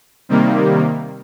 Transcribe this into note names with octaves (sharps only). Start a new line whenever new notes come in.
C3 D#3 G3 A#3